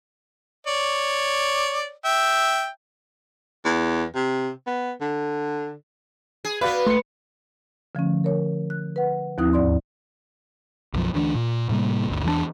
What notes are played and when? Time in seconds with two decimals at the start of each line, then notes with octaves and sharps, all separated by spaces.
0.67 C#5 D5
2.05 E5 G5
3.65 E2
4.15 C3
4.67 B3
5.01 D3
6.45 G#4
6.61 B3 F#4 B4 D5 F5
6.87 A3 C6 C#7
7.95 D3 F3 A3 C#4
8.24 A#4 C#5
8.70 F#6
8.96 B4 F#5
9.38 D#2 F3 C4 E4 D#6 F#6
9.53 D2 G#2 D5 C6
10.94 B1 F#2 F3
11.14 D2 E3 C4 D4
11.35 A#2
11.69 A2 C3 G3 A#3
12.08 G1 D2
12.25 E2 E3 G3 D4